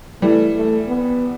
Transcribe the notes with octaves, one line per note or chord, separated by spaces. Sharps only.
E3 G3 A3
A3
B3